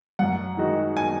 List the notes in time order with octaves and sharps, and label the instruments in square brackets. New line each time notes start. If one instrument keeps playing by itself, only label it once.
[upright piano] F#2 [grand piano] F#5
[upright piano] D#3 G#3 D#4 F#4
[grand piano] G#5